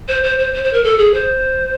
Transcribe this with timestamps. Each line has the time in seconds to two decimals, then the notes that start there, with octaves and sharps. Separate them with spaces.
0.08 C5
0.23 C5
0.39 C5
0.54 C5
0.64 C5
0.73 A#4
0.84 A4
0.98 G#4
1.14 C5